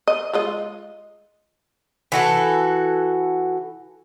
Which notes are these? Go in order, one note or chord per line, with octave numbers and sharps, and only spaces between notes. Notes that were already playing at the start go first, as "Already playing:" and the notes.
D#5
G#3 F4 D#5
E3 F#4 A4